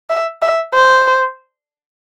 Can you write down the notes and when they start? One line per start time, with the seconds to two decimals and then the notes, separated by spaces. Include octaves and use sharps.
0.10 E5
0.42 E5
0.74 C5